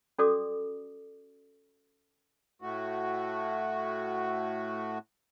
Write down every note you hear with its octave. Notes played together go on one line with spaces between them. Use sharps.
C#4 F#4 A4 D5 D6 D#6
A2 A3 F#4